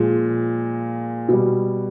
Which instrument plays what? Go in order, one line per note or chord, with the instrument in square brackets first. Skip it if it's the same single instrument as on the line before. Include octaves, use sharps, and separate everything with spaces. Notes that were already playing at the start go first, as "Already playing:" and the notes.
Already playing: [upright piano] A#2 F3 G#3
B2 G3